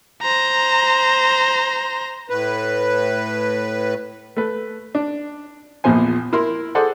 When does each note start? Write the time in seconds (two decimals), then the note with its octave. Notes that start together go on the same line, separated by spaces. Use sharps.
0.22 C5 A#5
2.30 A2 B4
4.37 A3 B4
4.95 D4
5.84 A#1 E2 A#2 F3 C5 G#5
6.33 E4 A#4 C6
6.75 G#4 A4 C5 D5 F#5